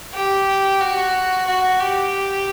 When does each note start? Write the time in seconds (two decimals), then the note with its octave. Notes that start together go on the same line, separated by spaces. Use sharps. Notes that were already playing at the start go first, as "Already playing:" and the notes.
0.14 G4
0.80 F#4
1.47 F#4
1.80 G4